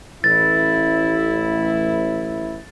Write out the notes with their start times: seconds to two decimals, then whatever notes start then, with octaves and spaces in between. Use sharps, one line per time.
0.24 A1 E4 A6